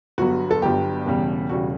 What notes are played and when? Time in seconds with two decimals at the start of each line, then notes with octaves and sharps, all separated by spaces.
0.18 G1 G2 F#3 B3 F#4
0.51 A4
0.62 G1 G2 F#3 B3 G4
1.05 E1 E2 C#3 G3
1.49 E1 E2 C#3 G3 F#4